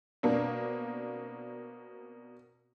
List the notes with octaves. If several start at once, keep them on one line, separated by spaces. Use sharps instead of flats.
B2 A#3 C4 D4